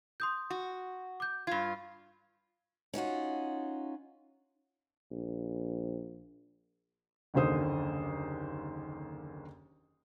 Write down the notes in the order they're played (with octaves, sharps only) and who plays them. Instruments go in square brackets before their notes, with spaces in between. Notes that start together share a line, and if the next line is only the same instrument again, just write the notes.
[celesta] C6 D#6 G6
[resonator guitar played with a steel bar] F#4
[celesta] D6 G6
[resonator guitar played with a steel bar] G2 F4 [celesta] G#6
[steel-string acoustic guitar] C#4 D#4 F4 F#4
[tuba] A#1
[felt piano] F#1 D#2 D3 C5 D#6